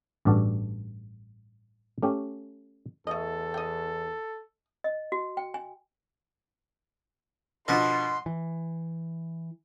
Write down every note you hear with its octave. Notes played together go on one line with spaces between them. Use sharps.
A1 G2 D4 F#4 A4
A3 C#4 G4
E2 A3 A4 D#5
D#5 G5
D#5
F#4
G5
G#5
B2 D3 F3 D#5 F#5 B5 C6
E3